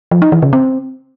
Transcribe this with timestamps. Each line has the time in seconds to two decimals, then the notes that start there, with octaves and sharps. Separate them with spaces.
0.11 F3
0.22 D#4
0.32 E3
0.42 C#3
0.53 C4